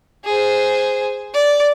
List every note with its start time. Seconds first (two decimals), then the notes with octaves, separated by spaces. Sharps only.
0.25 G#4 C5
1.34 D5